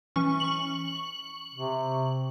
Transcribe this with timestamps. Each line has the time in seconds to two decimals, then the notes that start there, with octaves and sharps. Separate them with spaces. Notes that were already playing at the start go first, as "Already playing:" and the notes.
0.16 E3 C#4 C#6
0.40 C#6 F#7
1.53 C3